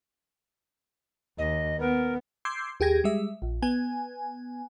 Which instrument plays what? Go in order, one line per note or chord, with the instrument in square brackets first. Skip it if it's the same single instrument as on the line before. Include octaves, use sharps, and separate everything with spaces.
[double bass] D#2 [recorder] D#5
[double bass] B3 [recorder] A#4
[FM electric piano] C6 D6 E6 G6 G#6 C7
D#2 G4 G#4 G5 G#6 A#6
G3 G#3 E5
A#1
B3 G#5